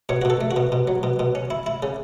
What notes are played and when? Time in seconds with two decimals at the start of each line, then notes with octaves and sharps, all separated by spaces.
0.09 B2 C#5
0.22 F#4
0.25 B2 A4
0.41 A3
0.51 F#4
0.56 B2
0.72 B2
0.88 F#3
1.03 B2
1.19 B2
1.35 C#4
1.50 E4
1.66 E4
1.83 C#3